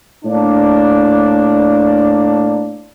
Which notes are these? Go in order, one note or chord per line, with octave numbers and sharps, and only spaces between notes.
A2 A#3 D4